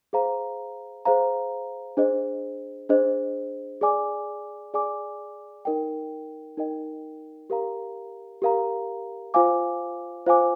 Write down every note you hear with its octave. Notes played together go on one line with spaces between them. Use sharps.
G#4 C5 F5 A#5
G#4 C5 F5 A#5
D4 G#4 C5 D#5
D4 G#4 C5 D#5
G#4 D5 G#5 D6
G#4 D5 G#5 D6
D#4 A#4 D#5 G5
D#4 A#4 D#5 G5
G4 A#4 F5 A#5
G4 A#4 F5 A#5
F4 C5 F5 G#5 D6
F4 C5 F5 G#5 D6